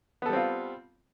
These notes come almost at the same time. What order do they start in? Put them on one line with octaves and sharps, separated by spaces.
B3 A4 G3 C4 F4